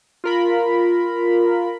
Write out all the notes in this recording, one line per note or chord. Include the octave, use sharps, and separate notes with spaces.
F4 A#4 B5